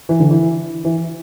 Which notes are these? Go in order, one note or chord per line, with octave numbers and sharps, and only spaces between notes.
E3
D3
E3
E3